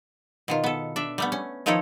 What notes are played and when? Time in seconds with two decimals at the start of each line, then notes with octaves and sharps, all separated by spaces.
0.48 B2 D#3 F4
0.64 B3 A4
0.96 D4 E5
1.18 G3 A3 B3
1.32 C#4
1.66 D#3 F3 D#4 E4 A4 C#5